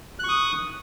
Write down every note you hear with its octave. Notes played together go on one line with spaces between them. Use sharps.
C#6 D#6 F#6